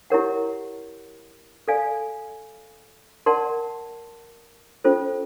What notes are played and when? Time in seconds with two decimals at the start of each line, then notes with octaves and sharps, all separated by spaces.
0.10 E4 G4 A#4 C#5 F#5
1.68 A4 D5 F5 G#5
3.26 A#4 D5 F#5 A5 C6
4.84 C#4 F4 A4 C5